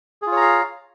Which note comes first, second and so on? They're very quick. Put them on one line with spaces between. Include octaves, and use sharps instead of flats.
G#4 F4 C#5 A#5 F5